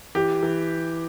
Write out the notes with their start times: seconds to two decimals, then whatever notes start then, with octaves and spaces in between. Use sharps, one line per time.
0.15 E3 G4
0.43 E3